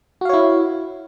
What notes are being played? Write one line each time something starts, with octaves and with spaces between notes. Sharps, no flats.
E4 F#4 C#5 F5